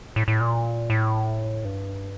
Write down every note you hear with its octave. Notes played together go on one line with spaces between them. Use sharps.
A2
A2
A#2
A2
G2